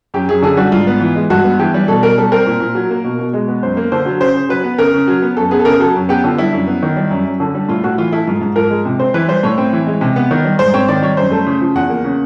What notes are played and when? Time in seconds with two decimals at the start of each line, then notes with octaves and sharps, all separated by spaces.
0.14 F#2 G4
0.29 F#2 G#4
0.43 D3 G#4
0.57 G3 F#4
0.72 G#2 F4
0.87 B3
1.00 E3
1.16 G#3
1.30 G2 F#4
1.44 B3
1.59 E3 G4
1.74 G3
1.88 B2 A4
2.02 B2 A#4
2.18 G3 A4
2.32 C4 A#4
2.47 A#2
2.61 A#2
2.75 F#3
2.90 A#3
3.04 B2
3.19 B2
3.33 G#3
3.48 B3
3.62 F#2 C5
3.77 A#3
3.92 D3 C5
4.06 F#3
4.20 C#3 C5
4.35 C#3
4.49 F#3 B4
4.64 B3
4.78 C#3 A#4
4.94 C#3
5.08 F#3
5.22 B3
5.37 F#2 A4
5.51 B3 G#4
5.59 A4
5.65 C#3 A#4
5.80 F#3 A4
5.95 F#2
6.09 B3 G4
6.24 D3 F4
6.38 G3 E4
6.53 F#2
6.67 B3
6.82 D#3
6.96 G3
7.11 F#2
7.25 F#2
7.40 D3
7.55 G3
7.69 A2 F4
7.84 A2 F#4
7.98 E3 F4
8.12 A3 E4
8.27 G#2 F4
8.42 G#2
8.56 F3 A#4
8.70 G#3
8.85 C3
9.00 C4 C5
9.14 E3 B4
9.28 G3 C5
9.43 A2 C#5
9.58 C4
9.73 E3
9.87 G#3
10.01 C3
10.16 B3
10.31 D#3
10.45 G3
10.59 G#2 C5
10.74 C4 C#5
10.88 D#3 D5
11.02 G3 C#5
11.17 F#2 C5
11.32 A3
11.47 C#3
11.61 F3
11.75 E2 F#5
11.89 A#3
12.04 C#3